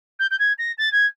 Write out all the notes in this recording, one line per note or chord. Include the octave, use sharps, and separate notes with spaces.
G6
G6
G#6
A#6
A6
G#6